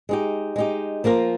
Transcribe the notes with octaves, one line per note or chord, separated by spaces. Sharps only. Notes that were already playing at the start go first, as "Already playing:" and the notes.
G#3 D#4 G4
G#3 D#4 G4
F3 A#3 F4 A#4